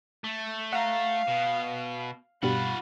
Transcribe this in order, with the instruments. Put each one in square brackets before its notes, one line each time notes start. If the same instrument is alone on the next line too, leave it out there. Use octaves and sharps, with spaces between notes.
[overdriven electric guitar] A3
[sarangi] F5 [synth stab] F#5 A#5
[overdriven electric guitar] B2
[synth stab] G2 B2 G3 [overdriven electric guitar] F4 F#5 [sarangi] B5